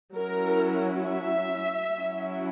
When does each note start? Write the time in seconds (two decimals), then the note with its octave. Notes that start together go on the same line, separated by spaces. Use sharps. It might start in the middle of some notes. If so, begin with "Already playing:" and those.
0.16 F#3 C#4 E4 A#4
1.06 E5
1.96 F#3 C#4 E4